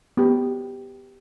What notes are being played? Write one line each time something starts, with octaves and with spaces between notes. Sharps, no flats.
B3 G4